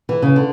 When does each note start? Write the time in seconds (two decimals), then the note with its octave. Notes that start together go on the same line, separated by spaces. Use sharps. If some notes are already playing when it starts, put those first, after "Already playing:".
0.09 E3
0.22 C#3
0.36 D3